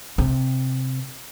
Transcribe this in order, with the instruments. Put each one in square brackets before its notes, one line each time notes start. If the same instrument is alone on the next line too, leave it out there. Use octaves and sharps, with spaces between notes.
[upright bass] C3